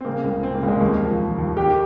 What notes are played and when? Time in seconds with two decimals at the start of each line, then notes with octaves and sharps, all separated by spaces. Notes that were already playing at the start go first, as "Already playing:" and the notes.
0.01 C4
0.05 C#3 A#3
0.24 C#2
0.43 C#3 C4
0.55 A#3
0.63 C#2
0.68 G#3
0.79 D#2 A#3
1.00 F3
1.20 F3
1.38 D#2
1.57 D#3 G4